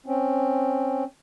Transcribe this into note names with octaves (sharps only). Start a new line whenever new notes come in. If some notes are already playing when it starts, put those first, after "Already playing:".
C4 C#4